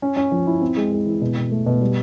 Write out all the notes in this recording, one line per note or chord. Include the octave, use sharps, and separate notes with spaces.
C#4
C#4
F3
E4
C4
G#3
G#3
E3
B2
B2
A3
B2
G3